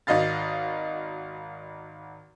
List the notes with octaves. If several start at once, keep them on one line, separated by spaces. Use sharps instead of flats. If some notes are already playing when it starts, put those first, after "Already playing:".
G#1 F#4 D#5 F5 A6